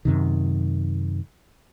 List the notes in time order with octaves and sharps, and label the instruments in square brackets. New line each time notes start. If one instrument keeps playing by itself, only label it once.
[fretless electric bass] F#2 C3 D#3